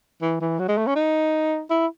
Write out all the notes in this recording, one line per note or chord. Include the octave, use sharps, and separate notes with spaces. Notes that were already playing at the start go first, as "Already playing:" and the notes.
E3
E3
F#3
G#3
A3
C#4
D#4
E4